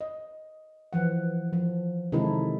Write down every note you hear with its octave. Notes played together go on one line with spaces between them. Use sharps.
D#5
E3 F3 F#5
F3
C3 D#3 G#3 D#4 E4 A4